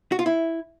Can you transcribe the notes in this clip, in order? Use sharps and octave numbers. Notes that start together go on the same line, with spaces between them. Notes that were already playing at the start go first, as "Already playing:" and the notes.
F#4
F4
E4